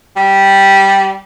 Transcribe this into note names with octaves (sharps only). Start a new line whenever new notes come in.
G3